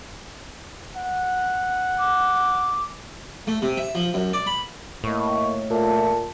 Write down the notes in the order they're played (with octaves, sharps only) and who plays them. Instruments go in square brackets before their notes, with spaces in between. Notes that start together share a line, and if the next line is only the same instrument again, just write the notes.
[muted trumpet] F#5
[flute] D6
[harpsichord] A3
C3
E5
F3
F#2
D5
B5
[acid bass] A2 [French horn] A#3 [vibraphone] D#5 C#6
[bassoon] A#2 [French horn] A3 [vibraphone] F4 A5